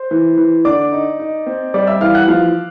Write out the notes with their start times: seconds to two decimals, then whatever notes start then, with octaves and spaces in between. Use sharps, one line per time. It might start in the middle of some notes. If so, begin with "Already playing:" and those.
Already playing: C5 C6
0.11 E3
0.37 E3
0.65 D3 D5 D6
0.92 D#4
1.20 D#4
1.46 C4
1.74 G3 D5 D6
1.87 E5 E6
2.01 E3 F5 F6
2.14 F#5 F#6
2.28 F3 F5 F6